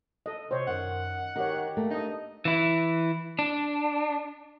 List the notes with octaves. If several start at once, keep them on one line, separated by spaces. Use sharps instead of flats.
A4 D#5
C3 C5 C#5
F#2 D#3 F#5
D#3 G4 C#5 D#5
A3 A#3
D4 D#4 D#5
E3 E4
D4